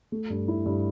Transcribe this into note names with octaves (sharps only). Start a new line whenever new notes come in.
A3
G2
E4
G2